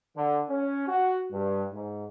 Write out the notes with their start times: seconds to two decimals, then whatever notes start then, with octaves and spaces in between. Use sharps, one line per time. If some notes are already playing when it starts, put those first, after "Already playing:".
0.16 D3
0.49 C#4
0.86 F#4
1.31 G2
1.73 G#2